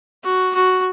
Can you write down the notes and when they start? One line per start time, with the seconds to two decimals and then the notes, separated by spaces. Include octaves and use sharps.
0.24 F#4
0.55 F#4